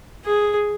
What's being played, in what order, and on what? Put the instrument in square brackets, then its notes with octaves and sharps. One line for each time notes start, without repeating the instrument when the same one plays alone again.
[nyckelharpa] G#4